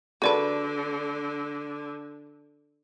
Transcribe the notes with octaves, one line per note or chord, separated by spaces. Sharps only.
D3 F#4 G#4 A4 B4 D5 A5